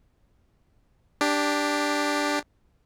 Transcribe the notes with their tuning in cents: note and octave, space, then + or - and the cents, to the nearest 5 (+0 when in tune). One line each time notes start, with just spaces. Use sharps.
D4 +0 G4 +15